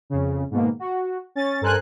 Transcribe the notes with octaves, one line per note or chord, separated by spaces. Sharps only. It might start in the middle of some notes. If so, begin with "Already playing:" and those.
F2 C#3
G#2 B2 D#3 A#3
F#4
C#4 A6
G2 A4 A#4 C5 G#5 F#6